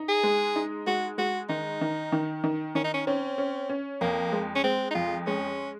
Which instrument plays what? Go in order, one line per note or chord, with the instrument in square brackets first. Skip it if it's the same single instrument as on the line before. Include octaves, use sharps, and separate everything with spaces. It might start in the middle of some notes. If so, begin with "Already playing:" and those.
Already playing: [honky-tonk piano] D#4
[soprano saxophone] G#4
[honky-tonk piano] G#3
D#4
[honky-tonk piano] G#3 [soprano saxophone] F#4
[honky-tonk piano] G#3 [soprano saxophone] F#4
[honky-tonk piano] D#3 [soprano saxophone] D#4
[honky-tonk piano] D#3
D#3
D#3
[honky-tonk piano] D#3 [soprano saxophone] C#4
[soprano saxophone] D#4
C#4
[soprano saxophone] C4 [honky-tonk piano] C#4
[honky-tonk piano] C#4
C#4
[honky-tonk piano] F2 [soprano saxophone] A#3
[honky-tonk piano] G#3
[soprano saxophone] C#4
[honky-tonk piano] G#3 [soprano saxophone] C4
[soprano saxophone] D#4
[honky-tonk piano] F2 [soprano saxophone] F4
[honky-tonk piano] G#3 [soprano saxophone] C#4